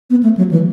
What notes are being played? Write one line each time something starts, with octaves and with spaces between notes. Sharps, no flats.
B3
A3
F#3
E3